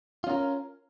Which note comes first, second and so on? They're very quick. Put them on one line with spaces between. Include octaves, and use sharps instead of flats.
F4 C#4 A#4